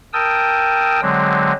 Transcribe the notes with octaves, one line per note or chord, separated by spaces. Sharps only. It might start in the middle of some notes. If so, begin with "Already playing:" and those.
A#4 G5 A5 D#6 E6
D3 F#3 G#3 C4